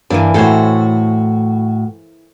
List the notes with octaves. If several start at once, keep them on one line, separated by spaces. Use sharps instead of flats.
G2 E3 A#3 D4
A2 F#4 A4 C5 C#5